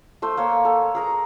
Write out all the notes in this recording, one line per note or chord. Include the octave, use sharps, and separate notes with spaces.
A3 C5 C6
A#3 C#5
A4
G#4 A#4 A#5